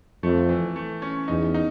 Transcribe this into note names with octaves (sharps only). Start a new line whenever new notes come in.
F2 A3
E3
A3
C#4
E2 D#4
D#4